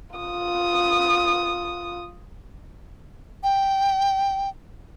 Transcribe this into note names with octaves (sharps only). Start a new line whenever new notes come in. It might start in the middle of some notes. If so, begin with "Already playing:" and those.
F4 D#6
G5